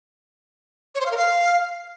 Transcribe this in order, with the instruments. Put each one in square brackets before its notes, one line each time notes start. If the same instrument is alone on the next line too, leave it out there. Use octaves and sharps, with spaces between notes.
[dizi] C#5
C5
F5
A#4
F5